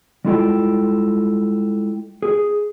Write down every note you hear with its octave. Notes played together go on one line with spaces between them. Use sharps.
G3 G#3 E4 F4 A4 G5
G#4